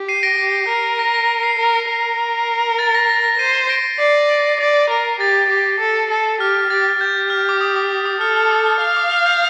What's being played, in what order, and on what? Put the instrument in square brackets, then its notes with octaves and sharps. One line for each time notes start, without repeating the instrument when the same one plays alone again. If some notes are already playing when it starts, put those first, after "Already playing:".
Already playing: [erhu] G4
[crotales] C7 D#7
A#6 D7
[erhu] G4 [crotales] A#6
[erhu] A#4 [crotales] C7
[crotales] A#6
A#6
C7
[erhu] A#4
A#4
[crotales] A6
A#6
A#6
A#6
[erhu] C5 [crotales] C7 D#7
[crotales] A#6 D7
[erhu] D5 [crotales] C7
[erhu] D5
A#4
[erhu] G4 [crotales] A6
[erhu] G4
A4
A4
[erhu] G4 [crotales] F6
[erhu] G4 [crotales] A6
[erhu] G4 [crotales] G6
[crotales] F6
D6
D#6
D6
D#6
[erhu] A4 [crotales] F6
[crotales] F6
D#6
F6
[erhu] F5 [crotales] F6
[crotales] D6
F6
G6